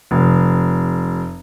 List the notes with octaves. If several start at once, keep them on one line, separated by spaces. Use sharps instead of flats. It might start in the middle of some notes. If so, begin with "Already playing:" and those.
F1